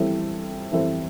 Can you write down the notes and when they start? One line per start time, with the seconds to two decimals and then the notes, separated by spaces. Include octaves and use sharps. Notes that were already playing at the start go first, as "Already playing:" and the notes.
Already playing: E3 G3 C4 E4 A4
0.72 E3 G3 C4 E4 A4